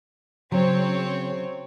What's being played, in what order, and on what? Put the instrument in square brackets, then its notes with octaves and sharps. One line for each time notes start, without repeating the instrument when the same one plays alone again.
[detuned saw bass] C#3 [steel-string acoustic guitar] F#3 [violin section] C4 C#5